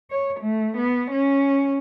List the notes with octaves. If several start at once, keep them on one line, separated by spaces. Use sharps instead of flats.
C#5
A3
B3
C#4